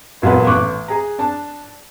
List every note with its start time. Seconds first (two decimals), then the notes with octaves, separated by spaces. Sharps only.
0.22 E1 A#2 F#3 B3 B4
0.47 A1 C#6 D6 F#6
0.88 G#4 A#5
1.19 D4 A5